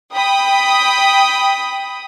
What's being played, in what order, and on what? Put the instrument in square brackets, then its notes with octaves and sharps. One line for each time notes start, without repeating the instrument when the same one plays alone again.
[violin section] G5 B5 D#6